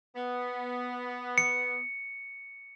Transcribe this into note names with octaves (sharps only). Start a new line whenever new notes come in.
B3
C#7